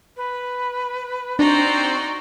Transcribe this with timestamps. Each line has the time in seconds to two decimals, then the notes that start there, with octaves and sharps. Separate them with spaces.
0.16 B4
1.39 C4 D4 D#4 F#4 C5 D5